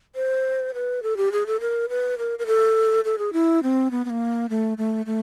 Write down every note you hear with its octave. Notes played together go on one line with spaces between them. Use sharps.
C5
B4
A4
G4
G#4
A4
A#4
B4
A#4
A#4
A4
A4
G#4
E4
C4
B3
B3
A#3
A3
A3
A3